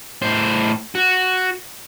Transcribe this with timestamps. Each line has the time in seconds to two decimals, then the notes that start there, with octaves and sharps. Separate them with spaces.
0.22 A2 C5
0.95 F#4